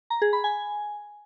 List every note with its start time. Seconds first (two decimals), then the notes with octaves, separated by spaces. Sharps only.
0.10 A#5
0.22 G#4
0.33 B5
0.44 G#5